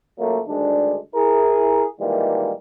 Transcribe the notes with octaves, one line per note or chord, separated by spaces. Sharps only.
C#2 F#3 A3 A#3
D2 D#3 G3 G#3 D4
E4 G#4 A#4
A#2 D#3 E3 G3 G#3 A#3